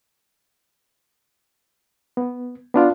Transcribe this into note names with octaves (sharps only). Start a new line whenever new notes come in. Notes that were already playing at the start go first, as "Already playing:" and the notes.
B3
B3 D4 F4